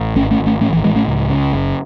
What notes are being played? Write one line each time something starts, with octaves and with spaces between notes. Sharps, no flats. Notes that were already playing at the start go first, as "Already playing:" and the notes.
Already playing: A1
G#1 A3 C#4
A3 C#4
G#1
A3 C#4
A1 A3 C#4
E3
A2 E3 G#3
A3 C#4
C#2
C#3
F#1